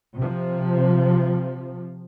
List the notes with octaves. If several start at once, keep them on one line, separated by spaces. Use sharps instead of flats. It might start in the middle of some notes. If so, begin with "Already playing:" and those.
C3 F3